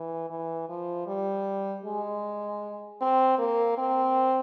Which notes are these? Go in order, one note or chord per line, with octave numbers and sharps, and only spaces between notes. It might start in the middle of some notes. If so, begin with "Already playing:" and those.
Already playing: E3
E3
F3
G3
G#3
C4
A#3
C4